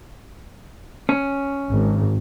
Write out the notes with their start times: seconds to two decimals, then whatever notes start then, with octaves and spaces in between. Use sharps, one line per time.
1.09 C#4
1.71 G#1